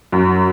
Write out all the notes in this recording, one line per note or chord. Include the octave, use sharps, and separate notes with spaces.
F#2